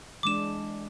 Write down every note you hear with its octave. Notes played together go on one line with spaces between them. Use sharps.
E3 G#3 D4 D6 E7